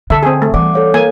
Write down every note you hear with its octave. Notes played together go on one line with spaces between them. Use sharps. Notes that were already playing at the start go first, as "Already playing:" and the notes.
D3 A4 E5
C4 G#4
A3
E3 G3 D5 F#5 D6
A4 C#5 F5
A#3 G#5